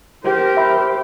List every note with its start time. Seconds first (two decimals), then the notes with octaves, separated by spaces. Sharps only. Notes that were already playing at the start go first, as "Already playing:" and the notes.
0.24 G4 A#4 C5
0.57 E5 B5